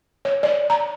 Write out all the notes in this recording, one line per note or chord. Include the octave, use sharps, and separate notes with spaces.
C#5
D5
A#5